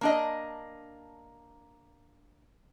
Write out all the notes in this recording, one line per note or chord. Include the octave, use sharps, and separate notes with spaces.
A#3 D4 D#5